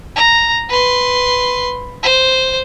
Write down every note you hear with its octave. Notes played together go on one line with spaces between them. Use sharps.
A#5
B4 C6
C5